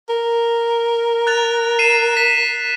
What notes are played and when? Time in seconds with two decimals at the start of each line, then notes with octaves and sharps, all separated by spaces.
0.09 A#4
1.27 F#6 A6 F7
1.79 C7 D#7 E7
2.17 B6